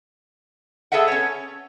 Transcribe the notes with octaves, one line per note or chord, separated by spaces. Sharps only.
G#4 A4 B4 E5 F#5
C#4 C#5